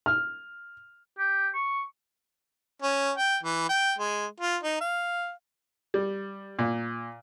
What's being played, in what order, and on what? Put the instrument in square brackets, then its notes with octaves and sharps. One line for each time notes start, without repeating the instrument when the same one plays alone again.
[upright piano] F6
[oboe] G4
C#6
[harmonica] C#4
G5
E3
G5
G#3
F4
D#4
F5
[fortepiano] G3
A#2